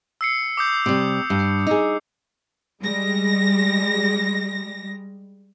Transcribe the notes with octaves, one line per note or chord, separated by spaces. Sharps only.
E6 C7 C#7
D6 D#6 G6
C3 G3
G2
D#4 G#4
G3 G#3 A#6